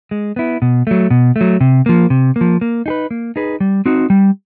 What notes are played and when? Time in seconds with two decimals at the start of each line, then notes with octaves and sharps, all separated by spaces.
0.11 G#3
0.36 B3 E4
0.62 B2
0.87 F#3 A3
1.11 B2
1.36 F#3 A3
1.61 C3
1.86 F3 A#3
2.10 C3
2.36 A#3
2.41 F3
2.61 A#3
2.86 D#4 G#4 B4
3.11 A#3
3.36 D#4 G#4 B4
3.60 G3
3.86 C4 D#4 F#4
4.10 G3